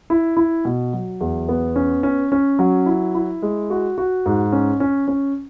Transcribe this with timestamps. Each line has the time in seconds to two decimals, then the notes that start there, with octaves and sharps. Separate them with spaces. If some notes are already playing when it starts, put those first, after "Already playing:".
0.10 E4
0.37 E4
0.65 B2
0.93 F#3
1.21 E2
1.49 B3
1.76 C#4
2.03 C#4
2.32 C#4
2.59 F#3
2.86 E4
3.15 E4
3.42 G#3
3.70 F#4
3.98 F#4
4.26 G#2
4.52 C#4
4.80 C#4
5.08 C#4